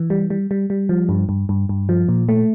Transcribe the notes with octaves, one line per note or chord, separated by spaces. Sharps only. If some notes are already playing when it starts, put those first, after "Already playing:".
Already playing: E3
G3
G3
G3
G3
F3
G2
G2
G2
G2
F3
A#2
A3